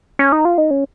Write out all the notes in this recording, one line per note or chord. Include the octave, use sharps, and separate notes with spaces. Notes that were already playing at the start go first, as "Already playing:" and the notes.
C#4
D#4
F4
D#4
C#4